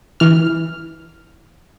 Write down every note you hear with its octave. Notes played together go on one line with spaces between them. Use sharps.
E3 F6